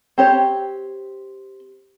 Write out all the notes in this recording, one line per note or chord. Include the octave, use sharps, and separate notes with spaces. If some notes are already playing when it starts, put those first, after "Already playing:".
C4 G4 C#5